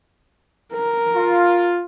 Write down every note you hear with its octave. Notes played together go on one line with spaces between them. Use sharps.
A#4
F4